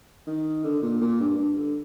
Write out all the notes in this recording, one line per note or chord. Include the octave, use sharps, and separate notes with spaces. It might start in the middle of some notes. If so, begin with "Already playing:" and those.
D#3
D3
A#2
A#2
G2
G2
D3